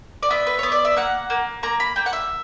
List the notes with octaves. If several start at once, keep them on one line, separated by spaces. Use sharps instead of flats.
D5
B3 E5
B4
B3 C#5
D5
E5
A#3 F#5
A#3
A#3 A#5
B5
A#3 G5
F#5
E5